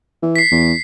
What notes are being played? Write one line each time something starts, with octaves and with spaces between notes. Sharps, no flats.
E3
B6 C7
E2